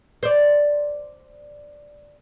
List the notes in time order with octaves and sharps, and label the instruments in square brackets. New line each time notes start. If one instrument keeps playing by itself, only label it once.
[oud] C5 D5